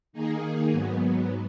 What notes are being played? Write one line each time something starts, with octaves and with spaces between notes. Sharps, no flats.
D#3 A#3 D#4 G#4
G#2 F#3 B3